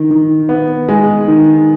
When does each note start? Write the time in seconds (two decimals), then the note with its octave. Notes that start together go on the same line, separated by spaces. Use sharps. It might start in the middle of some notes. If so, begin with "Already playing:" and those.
Already playing: D#3
0.11 D#3
0.49 B3
0.89 G#3
1.28 D#3